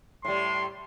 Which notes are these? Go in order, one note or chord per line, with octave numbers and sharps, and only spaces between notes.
A2 G3 C6